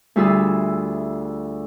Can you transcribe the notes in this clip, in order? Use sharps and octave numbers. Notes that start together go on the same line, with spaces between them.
D2 G3 E4 F4 G#4 E6